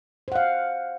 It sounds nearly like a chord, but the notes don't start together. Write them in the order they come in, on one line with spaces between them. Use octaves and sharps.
C5 F#5 F5